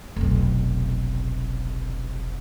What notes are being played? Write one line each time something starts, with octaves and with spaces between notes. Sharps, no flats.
F1 B1